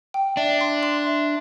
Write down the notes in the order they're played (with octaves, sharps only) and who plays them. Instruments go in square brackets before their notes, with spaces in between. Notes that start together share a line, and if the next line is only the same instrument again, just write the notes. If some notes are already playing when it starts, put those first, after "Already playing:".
[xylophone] G5
[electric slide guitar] D4 [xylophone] E5
[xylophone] C6
C6
E5